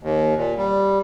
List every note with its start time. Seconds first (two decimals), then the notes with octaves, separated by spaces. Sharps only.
0.03 D#2
0.38 A#2
0.58 G3